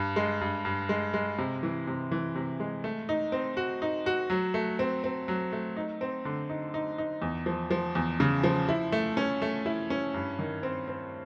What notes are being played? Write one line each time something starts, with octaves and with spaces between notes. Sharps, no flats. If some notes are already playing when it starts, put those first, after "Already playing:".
Already playing: G2
G#3
G2
G2
G#3
G#3
C3
E3
C3
E3
C3
G#3
A3
D#4
C4
F#4
D#4
F#4
F#3
A3
C4
C4
F#3
A3
D#4
C4
D3
D#4
D#4
D#4
E2
F3
F3
E2
C#3
F3
E4
A3
C#4
A3
E4
C#4
G2
D#3
C4
C4